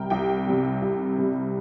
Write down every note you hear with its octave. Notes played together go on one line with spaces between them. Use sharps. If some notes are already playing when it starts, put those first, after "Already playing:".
Already playing: C2 C3 G3 A#4 G5
C2 G5
C3 G3
C2
C3 G3